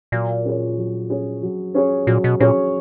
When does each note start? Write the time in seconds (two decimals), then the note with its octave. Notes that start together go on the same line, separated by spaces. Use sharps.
0.12 A#2 F#3
0.45 C#4 G#4 C#5
0.78 F#3
1.10 C#4 G#4 C#5
1.43 F#3
1.75 C#4 G#4 C#5
2.07 A#2 F#3
2.24 B2
2.40 A#2 C#4 G#4 C#5